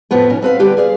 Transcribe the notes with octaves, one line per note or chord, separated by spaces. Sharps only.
F2 A2 F3 B3 B4
B2 D#3 C#4
C4 B4 F5
D3 G3 G4 B4
G#4 D5 F5